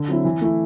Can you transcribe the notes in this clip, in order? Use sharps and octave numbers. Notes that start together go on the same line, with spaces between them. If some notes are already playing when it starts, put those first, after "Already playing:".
Already playing: D3
F#3 C4 E4
E3
A3 E4